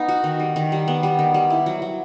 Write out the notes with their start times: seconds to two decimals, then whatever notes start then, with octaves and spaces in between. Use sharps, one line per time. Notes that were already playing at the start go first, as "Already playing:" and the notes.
Already playing: B3 D#4
0.08 F#4
0.24 D#3
0.40 G3
0.56 D#3
0.72 G3
0.88 B3
1.03 G3
1.19 D#3
1.34 G3
1.50 E4
1.66 F#3
1.82 F#3